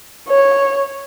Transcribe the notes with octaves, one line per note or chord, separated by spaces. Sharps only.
C#5